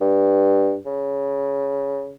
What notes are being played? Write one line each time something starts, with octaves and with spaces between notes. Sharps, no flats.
G2
C#3